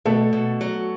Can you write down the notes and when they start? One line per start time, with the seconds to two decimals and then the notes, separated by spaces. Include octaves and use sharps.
0.05 B2 A3 A4
0.33 B2
0.61 F#3